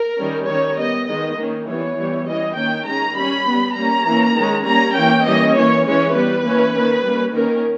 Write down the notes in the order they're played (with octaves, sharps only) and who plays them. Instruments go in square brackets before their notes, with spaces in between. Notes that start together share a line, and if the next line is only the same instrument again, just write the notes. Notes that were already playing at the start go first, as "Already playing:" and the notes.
Already playing: [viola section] A#4
D#3 G3 C#4
D#3 G3 C#4 C#5
G3 B3 D#5
D#3 G#3 B3 D#5
D#3 A#3 C#4
E3 G3 B3 C#5
E3 G3 B3
E3 G3 C#4 D#5
D#3 A#3 C#4 G5
D#3 G#3 C#4 A#5
G3 C#4 B5
G3 B3
G3 A#3 C#4 A#5
E3 A#3 C#4
D#3 G#3 C#4
G3 A#3 C#4 A#5
E3 A#3 C#4 G5
E3 G3 A#3 C#4 D#5
E3 A#3 C#4 C#5
E3 G#3 C#4 C#5
G3 B3 B4
E3 A#3 C#4
D#3 A#3 C#4
G3 A#3 C#4
D#3 A#3 C#4 A#4